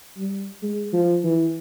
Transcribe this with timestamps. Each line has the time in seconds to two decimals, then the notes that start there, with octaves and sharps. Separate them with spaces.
0.17 G3
0.62 G#3
0.93 F3
1.24 E3